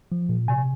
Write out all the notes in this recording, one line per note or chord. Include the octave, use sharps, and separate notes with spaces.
F3
A#2
C3 G#5